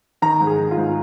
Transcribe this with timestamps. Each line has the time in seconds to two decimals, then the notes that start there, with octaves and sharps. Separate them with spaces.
0.22 D#3 A#5
0.41 G#2
0.47 G#4
0.59 D#3
0.71 F4
0.78 G#2